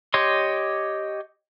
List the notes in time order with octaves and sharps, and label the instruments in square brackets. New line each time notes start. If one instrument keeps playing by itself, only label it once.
[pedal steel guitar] G4 C#5 D#5 C6